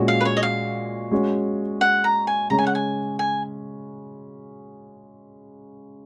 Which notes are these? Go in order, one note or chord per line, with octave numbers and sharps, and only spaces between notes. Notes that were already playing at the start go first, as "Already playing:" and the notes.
Already playing: A#2 G#3 C#4 F#4
F5
B4
C#5
D#5
F5
G#3 C#4 F#4
F#5
A#5
G#5
C#3 G#3 C#4 A#5
G#5
F#5
G#5
G#5